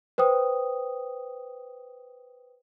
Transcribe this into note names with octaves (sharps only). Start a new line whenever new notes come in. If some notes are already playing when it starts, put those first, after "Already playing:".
B4 C5 G5 D#6